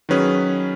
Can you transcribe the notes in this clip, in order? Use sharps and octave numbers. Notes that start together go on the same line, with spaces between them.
D#3 F#3 C#4 G#4 B4